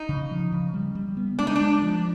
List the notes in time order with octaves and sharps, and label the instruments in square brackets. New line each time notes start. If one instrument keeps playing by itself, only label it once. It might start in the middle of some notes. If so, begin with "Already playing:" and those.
Already playing: [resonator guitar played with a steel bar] D#4
[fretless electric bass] C#3
F3
C#3
G3
G3
B3
[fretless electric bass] G#3 [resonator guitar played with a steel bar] D4
[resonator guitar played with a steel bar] D#4
D4
[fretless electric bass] G#3
F3